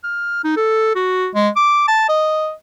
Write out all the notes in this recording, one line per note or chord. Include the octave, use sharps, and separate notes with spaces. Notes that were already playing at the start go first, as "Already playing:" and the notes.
F6
D#4
A4
F#4
G#3
D6
A5
D#5